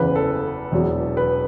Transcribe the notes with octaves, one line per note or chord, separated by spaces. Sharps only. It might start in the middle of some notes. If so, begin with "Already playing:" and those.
Already playing: F#1 E2 C#3 E3 B4
A4
E1 E2 B2 F#3
B4